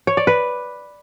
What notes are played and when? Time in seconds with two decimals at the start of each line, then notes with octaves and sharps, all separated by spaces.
0.07 C#5
0.17 D5
0.27 B4